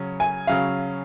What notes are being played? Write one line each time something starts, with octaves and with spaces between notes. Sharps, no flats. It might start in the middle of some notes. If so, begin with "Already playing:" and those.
Already playing: C#3 F#3 C#4
G#5
C#3 F#3 C#4 F5